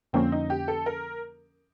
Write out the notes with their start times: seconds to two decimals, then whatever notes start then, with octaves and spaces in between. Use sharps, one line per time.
0.13 F2 D3 F3 A#3 C4 C#4
0.32 D#4
0.50 G4
0.68 A4
0.86 A#4